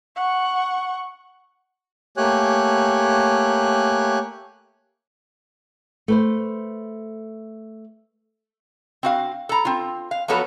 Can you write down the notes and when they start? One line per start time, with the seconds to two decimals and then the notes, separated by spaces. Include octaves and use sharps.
0.16 F#5 C#6
2.17 A3 A#3 G4 C#5 G#5 F#6
6.08 A3 B4 C5
9.03 C4 F#4 F5
9.49 A4 A#5
9.65 C4 F4
10.11 F5
10.28 F3 F#3 B3 F#4 A4 C#5